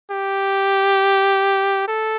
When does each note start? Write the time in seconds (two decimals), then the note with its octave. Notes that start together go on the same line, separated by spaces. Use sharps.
0.11 G4
1.88 A4